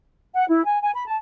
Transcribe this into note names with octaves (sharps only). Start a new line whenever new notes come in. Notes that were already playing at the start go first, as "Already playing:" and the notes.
F#5
E4
G#5
G#5
B5
A5